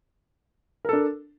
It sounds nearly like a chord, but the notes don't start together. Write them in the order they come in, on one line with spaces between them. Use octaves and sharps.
A#4 A4 D4